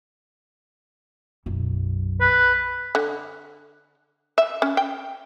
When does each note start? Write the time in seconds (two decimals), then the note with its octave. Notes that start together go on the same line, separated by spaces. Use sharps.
1.46 B1 F#2
2.21 B4
2.95 D3
4.38 E5
4.62 C#4
4.77 G5